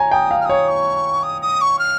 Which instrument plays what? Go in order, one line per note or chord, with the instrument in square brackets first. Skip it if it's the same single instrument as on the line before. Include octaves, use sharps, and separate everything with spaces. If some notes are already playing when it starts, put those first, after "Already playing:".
Already playing: [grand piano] C#5 G#5 A#5
[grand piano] G5 [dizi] D#6
[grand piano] F5
[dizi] F6
[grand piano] C#5 [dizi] D#6
[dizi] C#6
D#6
D#6
C#6
F6